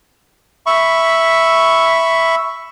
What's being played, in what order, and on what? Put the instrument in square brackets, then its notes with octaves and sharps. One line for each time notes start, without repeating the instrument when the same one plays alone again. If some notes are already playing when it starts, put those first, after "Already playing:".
[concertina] E5 B5 C#6